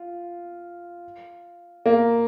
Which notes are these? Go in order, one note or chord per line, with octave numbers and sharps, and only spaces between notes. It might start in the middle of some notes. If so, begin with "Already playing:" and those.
Already playing: F4
A#3